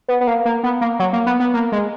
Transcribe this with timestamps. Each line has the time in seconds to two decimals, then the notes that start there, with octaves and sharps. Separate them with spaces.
0.08 B3
0.21 B3
0.27 A#3
0.45 A#3
0.63 B3
0.81 A#3
0.99 F#3
1.13 A#3
1.26 B3
1.40 B3
1.54 A#3
1.72 G#3